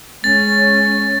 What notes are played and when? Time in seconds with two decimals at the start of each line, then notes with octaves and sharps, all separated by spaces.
0.24 G#3 C#4 A6